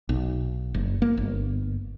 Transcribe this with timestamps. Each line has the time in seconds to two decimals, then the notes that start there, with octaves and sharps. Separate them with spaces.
0.09 B1
0.74 F#1
1.02 A#3
1.18 G1